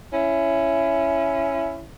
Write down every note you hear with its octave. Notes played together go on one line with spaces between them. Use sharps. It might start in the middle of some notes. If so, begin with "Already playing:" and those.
C#4 E4